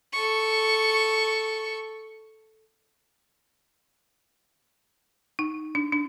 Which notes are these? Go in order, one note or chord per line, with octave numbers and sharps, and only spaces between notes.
A4 C#6
D#4
D4
D4